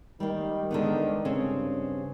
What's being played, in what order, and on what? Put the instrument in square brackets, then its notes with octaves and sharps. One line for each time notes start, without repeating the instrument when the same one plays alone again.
[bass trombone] D#3 [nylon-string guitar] G3 A#3
[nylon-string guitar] D3 G#3 B3 [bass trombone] D#3
[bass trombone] G2 [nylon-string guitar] C#3 C4